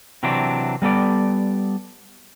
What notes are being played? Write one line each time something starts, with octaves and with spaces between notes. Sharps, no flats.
C3 E3 F#3 C4 D4
G3 B3 A4 D5